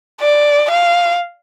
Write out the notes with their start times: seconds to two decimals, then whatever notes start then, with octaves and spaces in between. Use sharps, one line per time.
0.21 D5
0.71 F5